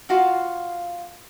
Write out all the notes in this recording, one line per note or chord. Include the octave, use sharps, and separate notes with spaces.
F4 F#4 F5